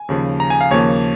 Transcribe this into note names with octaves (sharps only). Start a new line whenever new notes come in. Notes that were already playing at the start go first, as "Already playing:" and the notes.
Already playing: G#5
D#2 C#3 F3
A#5
G#5
F5
D#2 C#3 F3 A#3 C#5